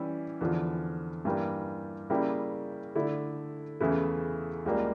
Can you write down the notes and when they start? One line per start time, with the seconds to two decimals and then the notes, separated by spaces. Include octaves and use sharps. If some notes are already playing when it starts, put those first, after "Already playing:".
Already playing: E3 G3 C#4 E4
0.41 E2 D3 F3
1.25 G2 E3 G3 A#3
2.10 C#3 G3 A#3 E4 G4
2.95 D3 A3 E4
3.80 E2 C#3 E3 A3 E4
4.66 C#2 C#3 G3 A#3